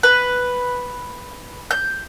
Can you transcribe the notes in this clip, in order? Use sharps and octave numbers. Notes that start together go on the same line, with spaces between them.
B4
G6